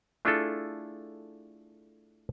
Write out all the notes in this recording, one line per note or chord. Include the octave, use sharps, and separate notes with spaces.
A3 D4 E4 F4 G#4 A4